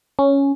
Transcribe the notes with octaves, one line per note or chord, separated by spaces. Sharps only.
C#4